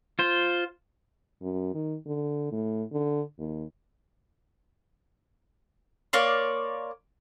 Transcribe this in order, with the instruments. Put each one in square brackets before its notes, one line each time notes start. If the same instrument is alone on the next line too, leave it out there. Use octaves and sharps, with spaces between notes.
[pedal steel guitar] F4 C5
[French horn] F#2
D#3
D3
A2
D3
D#2
[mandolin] A#3 C#5 D5 C6